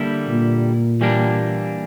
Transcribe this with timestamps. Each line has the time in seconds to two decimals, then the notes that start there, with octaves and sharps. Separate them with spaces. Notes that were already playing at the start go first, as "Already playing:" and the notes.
Already playing: D3 G3 A#3 E4 G4
0.27 A#2
1.01 E3 G3 A#3 D4